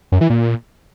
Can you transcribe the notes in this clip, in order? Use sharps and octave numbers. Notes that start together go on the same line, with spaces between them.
F#2
E3
A#2